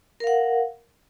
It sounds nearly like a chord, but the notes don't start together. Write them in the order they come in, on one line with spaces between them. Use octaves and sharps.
A#4 F5 F#5